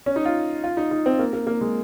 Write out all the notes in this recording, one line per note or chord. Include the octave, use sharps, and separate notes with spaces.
C#4
D#4
F4
F4
D#4
D#4
C4
A#3
A#3
A#3
G#3